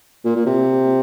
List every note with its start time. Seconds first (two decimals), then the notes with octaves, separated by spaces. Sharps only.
0.24 A#2
0.36 A#2
0.46 C3